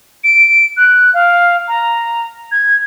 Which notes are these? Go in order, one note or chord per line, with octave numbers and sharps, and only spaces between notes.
D7
F#6
F5
A#5
G#6